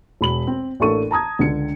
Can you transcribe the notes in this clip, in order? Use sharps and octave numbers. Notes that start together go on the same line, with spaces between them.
E1 B5 F#7
C4
A1 A#3 D4 A4 C#6 D#7
A5 A#5 D#6 G#6
C#2 D3 C#7